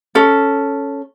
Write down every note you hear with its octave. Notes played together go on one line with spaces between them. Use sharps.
C#4 A4